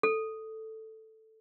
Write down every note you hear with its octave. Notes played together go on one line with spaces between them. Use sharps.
A4